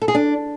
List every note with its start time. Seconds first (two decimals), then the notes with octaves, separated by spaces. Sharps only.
0.02 A4
0.08 G#4
0.15 D4